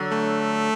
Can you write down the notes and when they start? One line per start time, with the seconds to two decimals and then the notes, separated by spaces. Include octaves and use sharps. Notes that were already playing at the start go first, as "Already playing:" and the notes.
Already playing: D3 F#3
0.11 A3